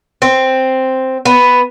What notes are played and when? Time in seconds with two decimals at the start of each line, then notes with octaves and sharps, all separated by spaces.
0.22 C4
1.25 B3